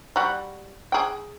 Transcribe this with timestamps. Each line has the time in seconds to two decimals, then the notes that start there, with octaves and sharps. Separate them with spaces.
0.16 G3 F#4
0.92 G#4 G5